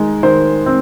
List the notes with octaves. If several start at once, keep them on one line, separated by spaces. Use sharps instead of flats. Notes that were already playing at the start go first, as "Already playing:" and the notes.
Already playing: D#3 G#3
D#3 C5
C4